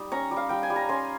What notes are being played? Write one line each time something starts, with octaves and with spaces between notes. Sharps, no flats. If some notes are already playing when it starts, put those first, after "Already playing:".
Already playing: G3 D#4
C#4 A#5 C#6
G3
F5
G3 G5
G#5
G3
A#5
C#4 G#5 C6